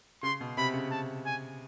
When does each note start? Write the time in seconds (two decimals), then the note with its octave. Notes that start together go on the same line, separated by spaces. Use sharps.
0.23 C#3 C6
0.41 B2
0.57 C3 B5
0.74 C#3
0.91 A5
1.26 G#5